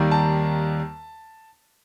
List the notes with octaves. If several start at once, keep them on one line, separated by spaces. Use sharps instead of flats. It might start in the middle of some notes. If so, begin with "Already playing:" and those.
Already playing: D#2 D#3 G3 A#3
A5